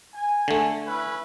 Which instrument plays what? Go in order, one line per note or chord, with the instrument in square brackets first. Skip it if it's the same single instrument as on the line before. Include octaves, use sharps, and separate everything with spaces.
[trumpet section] G#5
[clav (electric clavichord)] D3 A3
[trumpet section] C#4 E4 B4